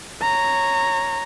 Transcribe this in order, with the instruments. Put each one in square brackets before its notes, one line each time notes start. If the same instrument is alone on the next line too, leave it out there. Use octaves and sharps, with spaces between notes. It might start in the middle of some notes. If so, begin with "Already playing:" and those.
[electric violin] C#5 A#5